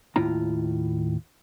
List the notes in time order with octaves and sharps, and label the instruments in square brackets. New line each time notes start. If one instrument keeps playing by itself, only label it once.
[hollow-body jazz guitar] D#2 A2 E4 F4 A#5